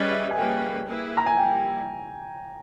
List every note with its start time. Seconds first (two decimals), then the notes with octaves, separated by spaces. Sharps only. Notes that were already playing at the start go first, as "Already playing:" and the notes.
Already playing: G3 C#4 G#4 B4 D#5
0.11 E5
0.31 G#5
0.37 G3 A#3 C#4 G#4 B4 G5
0.87 A#3 E4 G#4 B4
1.17 A#5
1.26 G#5
1.37 G3 A#3 E4 G5